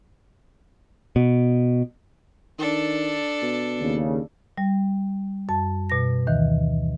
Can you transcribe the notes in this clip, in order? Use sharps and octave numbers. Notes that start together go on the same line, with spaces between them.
B2
D#3 D4 A4
B2
D#2 C#3
G3
F#2 A5
B2 A#6
D2 D#3 E3